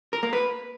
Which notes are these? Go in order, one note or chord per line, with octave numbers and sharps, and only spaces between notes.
A#4
A#3
B4